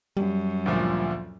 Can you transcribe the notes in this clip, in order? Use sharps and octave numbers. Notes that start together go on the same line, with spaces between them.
F#2 G3
D2 A#2 F3